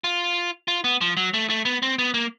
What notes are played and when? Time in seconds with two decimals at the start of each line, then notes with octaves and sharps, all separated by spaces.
0.04 F4
0.68 F4
0.84 B3
1.01 F3
1.17 F#3
1.34 A3
1.50 A3
1.65 B3
1.82 C4
1.99 B3
2.14 A#3